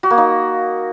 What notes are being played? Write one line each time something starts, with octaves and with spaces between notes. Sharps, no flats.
F#4
A#3
D#4